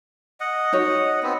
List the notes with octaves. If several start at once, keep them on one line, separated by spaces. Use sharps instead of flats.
D#5 F#5
D#4 F#4 C#5
B3 C4